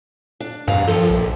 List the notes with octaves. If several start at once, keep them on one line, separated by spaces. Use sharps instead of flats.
D4
E2 G2 F5 A#5
D#2 F3 A4
A#1